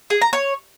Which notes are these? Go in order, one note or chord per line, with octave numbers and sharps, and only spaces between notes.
G#4
A#5
C#5